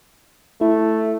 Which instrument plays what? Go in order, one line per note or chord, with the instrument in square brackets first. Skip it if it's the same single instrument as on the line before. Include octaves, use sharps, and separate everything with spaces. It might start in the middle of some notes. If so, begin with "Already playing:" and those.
[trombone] A3 [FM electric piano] E4